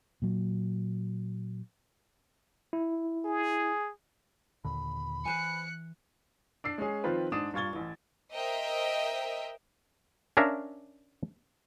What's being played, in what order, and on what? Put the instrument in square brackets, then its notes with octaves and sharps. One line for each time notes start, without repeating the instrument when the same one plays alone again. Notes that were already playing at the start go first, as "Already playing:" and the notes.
[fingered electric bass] A#2 F#3
[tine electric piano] E4
[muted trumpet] G#4
[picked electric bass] D#2 A#2 D3 [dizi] B5
[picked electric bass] E3 [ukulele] B4 C5 G#5 [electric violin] F#6 C#7
[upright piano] D4 E6 C7
G#3 C#4 G#4
D#3 F3 C4 F4 B4
G#2 D4 D#6 E7
G2 F4 C#6 G#6 A6 G7
A1 E3
[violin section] A#4 C5 D#5 E5 G5
[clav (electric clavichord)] C#4 D4 A#4 E5 F5